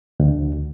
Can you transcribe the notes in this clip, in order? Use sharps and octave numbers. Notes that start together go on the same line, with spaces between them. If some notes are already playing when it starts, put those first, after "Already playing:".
D2